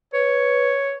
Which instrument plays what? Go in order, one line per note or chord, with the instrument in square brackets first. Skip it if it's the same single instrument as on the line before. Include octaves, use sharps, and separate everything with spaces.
[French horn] B4 [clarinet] C#5